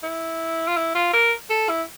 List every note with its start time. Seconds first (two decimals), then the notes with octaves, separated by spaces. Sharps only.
0.03 E4
0.68 F4
0.77 E4
0.95 F4
1.13 A#4
1.50 A4
1.69 E4